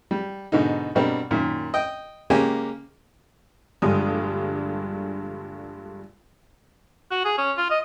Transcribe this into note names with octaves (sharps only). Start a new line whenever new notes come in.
G3
G#2 B2 D3 D#4
G2 B2 G3 C4 A#4
F#2 A#2 D#3
D#5 G5
C#3 G#3 A#3 C#4 G4 G#5
A#1 G2 D3 G3 G#3 D#6
F#4
G#4
C#4
F4
D#5